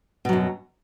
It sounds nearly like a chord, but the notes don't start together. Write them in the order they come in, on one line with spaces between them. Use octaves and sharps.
B2 F#3 F#2